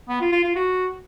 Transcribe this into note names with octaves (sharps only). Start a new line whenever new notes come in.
B3
F4
F4
F4
F#4